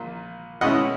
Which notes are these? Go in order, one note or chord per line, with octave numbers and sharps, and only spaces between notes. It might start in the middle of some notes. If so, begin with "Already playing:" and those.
Already playing: A#1 A#2 A#3
B2 G#3 C#4 E4 D#5 F#5